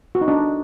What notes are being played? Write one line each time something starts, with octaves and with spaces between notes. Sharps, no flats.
F#4
D#4
D4